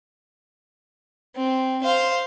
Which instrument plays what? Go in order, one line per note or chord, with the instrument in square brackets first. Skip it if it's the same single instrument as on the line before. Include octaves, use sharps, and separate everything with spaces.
[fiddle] C4
C5 F5